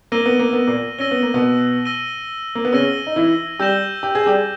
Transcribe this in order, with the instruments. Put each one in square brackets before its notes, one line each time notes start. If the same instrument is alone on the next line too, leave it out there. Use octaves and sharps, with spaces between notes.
[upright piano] A#3 [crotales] E6 A#6 D#7 G7
[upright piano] B3
A#3
B3
A#2 A#3
[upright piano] C#4 [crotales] E6 A#6 D#7 G7
[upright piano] B3
A#3
B2 B3
[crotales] E6 A#6 D#7 G7
[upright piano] A#3
B3
[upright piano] C#3 C#4 [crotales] E6 A#6 D#7 G7
[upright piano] D#4
E3 E4
[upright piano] G3 G4 [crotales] E6 G6 A#6 E7 G7
[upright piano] G4
G#4
G3 G4